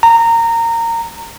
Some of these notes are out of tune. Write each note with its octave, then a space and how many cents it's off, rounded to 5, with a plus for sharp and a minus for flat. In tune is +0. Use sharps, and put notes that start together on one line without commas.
A#5 -20